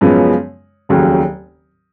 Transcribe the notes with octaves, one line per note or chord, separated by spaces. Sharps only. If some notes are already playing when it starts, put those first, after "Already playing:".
F#2 C#3 F3 G#3 B3
F1 D#2 C#3 F#3